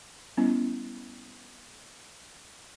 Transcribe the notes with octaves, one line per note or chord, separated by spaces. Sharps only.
G3 B3 C#4 E4